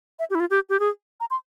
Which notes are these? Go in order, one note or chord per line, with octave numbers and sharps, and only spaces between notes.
E5
G4
E4
F4
G4
G4
G#4
A#5
C6